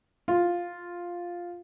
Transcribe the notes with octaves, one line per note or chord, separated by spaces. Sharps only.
F4